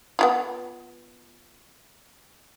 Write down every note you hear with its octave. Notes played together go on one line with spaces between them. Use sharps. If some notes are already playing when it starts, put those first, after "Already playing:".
B3 E4 F4